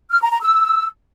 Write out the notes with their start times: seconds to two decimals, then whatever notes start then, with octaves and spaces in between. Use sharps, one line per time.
0.12 F6
0.22 A#5
0.32 A#5
0.42 E6